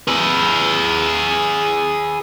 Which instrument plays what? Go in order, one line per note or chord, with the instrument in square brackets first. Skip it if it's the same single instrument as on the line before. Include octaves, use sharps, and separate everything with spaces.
[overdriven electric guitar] G#4 B4